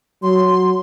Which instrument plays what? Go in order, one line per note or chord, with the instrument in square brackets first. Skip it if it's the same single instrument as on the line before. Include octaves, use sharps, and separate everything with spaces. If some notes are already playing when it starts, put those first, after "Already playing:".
[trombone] F#3 [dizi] C6